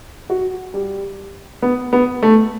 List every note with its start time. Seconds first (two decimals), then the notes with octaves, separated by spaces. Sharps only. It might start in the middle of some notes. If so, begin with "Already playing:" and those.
0.30 F#4
0.74 G3
1.62 B3
1.93 B3
2.23 A3